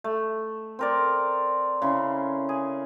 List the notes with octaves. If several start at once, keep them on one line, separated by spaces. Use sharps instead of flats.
A3
C4 A#4 D5
C#3 E4 C6
G#4